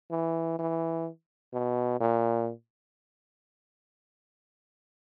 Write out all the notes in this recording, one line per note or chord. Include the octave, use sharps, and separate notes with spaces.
E3
E3
B2
A#2